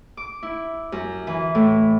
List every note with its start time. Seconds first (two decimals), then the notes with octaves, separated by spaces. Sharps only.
0.17 D6
0.43 E4
0.92 F#2
1.27 E3
1.55 A2